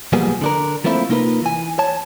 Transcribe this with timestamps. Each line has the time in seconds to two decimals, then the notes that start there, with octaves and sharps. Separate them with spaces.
0.13 B1 F3 G3 A#3 B3 G#4
0.41 D3 D4 A#4
0.84 F3 A3 A#3 C4 E4 F4
1.10 C3 A#3 D#4 F4 A#4 B4
1.42 E3 G#5
1.79 C#5 A5